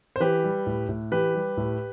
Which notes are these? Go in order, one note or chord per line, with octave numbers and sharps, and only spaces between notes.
C5
E3 G4 B4
G3
A2
A2
E3 G4 B4
G3
A2